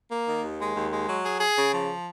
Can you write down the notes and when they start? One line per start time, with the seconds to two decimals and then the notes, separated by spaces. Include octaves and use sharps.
0.10 A#3
0.26 D#3
0.42 D#2
0.59 G#3
0.75 D#2
0.91 G#3
1.08 F#3
1.23 G#4
1.40 G#4
1.57 C#3
1.72 F3